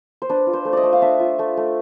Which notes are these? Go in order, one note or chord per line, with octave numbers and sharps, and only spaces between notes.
C5
D4 B4
F4
C5
A3
D5 D#5
A3
F5
D4 E5
F4
A3
A3